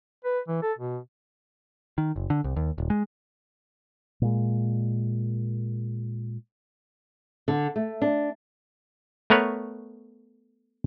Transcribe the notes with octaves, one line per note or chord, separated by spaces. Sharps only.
B4
E3
A4
B2
D#3
F#1
D3
C2
D#2
D#1
G#3
A#2 G#3
D3
A3
D4
A3 B3 A#4 B4 C#5